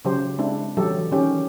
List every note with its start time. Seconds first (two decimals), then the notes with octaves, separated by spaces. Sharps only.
0.05 C#3 F#3 G4 C5
0.38 G#3 C4 D4 E4
0.77 E3 F#3 G3 G4 A4
1.11 D#3 F#3 C#4 G4